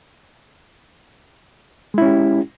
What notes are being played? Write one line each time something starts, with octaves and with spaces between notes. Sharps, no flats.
G#3 C#4 E4 G4